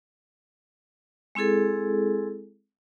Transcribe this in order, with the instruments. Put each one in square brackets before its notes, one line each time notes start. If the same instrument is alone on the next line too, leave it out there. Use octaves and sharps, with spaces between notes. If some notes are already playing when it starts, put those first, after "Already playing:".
[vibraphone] G#3 C4 E4 G#4 A4